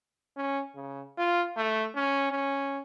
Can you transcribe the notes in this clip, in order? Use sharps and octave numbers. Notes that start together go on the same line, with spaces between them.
C#4
C#3
F4
A3
C#4
C#4